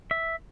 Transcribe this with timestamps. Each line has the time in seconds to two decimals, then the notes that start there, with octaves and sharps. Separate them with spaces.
0.11 E5